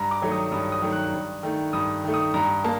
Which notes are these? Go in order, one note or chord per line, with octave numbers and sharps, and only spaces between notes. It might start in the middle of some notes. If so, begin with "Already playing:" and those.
Already playing: G2 A#5
D6
D#3 F#3 A3
D#6
G2 D#6
D#6
D#3 F#3 A3
F#6
G2
D#3 A3
G2 D#6
D#3 A3
D#6
G2 A#5
A#3 A5